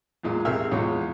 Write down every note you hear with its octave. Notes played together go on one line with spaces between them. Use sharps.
E2 A#2 G#3
B1 C3 G#4 A#4 E5 F6
B1 E2 G#3 F4 C#5